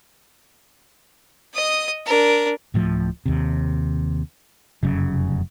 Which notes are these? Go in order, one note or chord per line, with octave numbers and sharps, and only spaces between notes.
D#5 D#6
D4 A#4
D1 A2 F3
D#2 C3
F1 F#2 C#3